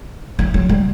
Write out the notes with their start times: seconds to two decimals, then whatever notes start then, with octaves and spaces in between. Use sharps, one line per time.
0.39 E3
0.54 F#3
0.69 G3